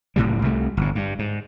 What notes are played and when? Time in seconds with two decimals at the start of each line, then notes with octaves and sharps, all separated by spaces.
0.16 F#1 A2 C3 G3
0.42 C2 C3 A3
0.77 G1 A2
0.95 G2
1.19 G#2